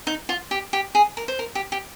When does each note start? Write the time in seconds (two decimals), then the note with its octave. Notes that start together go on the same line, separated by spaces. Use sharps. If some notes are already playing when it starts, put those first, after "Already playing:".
0.07 D#4
0.29 F4
0.51 G4
0.73 G4
0.95 G#4
1.17 A#4
1.28 C5
1.39 A#4
1.55 G4
1.72 G4